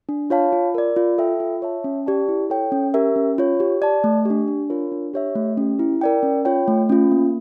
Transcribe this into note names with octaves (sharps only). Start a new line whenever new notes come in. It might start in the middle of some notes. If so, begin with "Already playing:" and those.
D4
F4 C#5 F5 A5
F4
A#4 D5
F4
A4 E5 G5
F4
C#5 E5 A5
C#4
G4 D5 A5
E4
A4 C#5 G5
C#4
G4 A#4 E5
C#4
F4 C#5
G4
D5 A5
A3
D4 G4
D4
F4 A#4 C#5
D4
G4 C#5 E5
A3
C#4 G4
E4
A#4 D5 G5
C#4
F4 C#5 G5
A3
C#4 F4
A#3